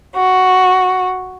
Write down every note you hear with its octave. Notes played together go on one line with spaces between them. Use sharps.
F#4